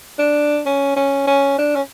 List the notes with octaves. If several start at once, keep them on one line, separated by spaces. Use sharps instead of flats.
D4
C#4
C#4
C#4
D4
C#4